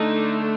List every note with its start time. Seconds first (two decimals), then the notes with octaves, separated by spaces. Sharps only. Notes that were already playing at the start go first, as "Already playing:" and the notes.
Already playing: D3 A3 D4 D#4